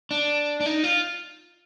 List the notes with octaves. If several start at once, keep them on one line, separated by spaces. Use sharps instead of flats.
D4
D4
D#4
F4